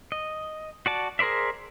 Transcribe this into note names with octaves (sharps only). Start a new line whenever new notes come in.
D#5
F#4 D5 A5
G#4 A#4 C5 D5 E5